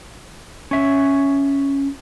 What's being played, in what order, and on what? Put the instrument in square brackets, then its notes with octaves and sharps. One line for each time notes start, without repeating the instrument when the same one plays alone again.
[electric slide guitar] C#4 E5